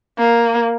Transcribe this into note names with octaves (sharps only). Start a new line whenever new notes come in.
A#3